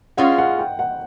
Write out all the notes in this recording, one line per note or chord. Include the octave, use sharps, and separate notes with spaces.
G#3 C#4 F4 F#5
F#5
G5
F#5